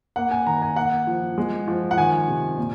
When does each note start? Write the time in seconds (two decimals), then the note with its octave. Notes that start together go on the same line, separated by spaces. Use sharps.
0.16 A#3 F#5
0.31 G#5
0.47 D#3 A#5
0.62 G#5
0.76 A#3 F#5
1.07 F3
1.38 G#3
1.68 F3
1.91 F#5
1.97 D#3 G#5
2.28 C3
2.57 A#2